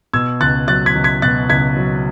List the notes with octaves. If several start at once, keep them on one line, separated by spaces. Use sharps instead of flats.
B2 E6 G#6
C#2 F#6 A6
F#3 F#6 A6
G#6 B6
C#2
G#6 B6
B2 F#6 A6
C#2 G#6 B6
F#3